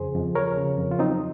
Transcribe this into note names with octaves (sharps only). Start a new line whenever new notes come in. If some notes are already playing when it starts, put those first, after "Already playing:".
Already playing: F2 C#3 G#4 C5
F2
F3 A#4 C#5
C#3
F2
F4
F#3 C4 D#4